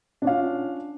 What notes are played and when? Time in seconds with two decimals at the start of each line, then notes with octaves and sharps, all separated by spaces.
0.22 D4
0.25 C#4
0.27 F5
0.30 F4